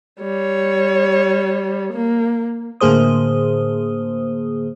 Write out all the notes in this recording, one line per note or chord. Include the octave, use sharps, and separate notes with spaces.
G3 C#5
A#3
A2 D3 A#3 G#4 C5 D#6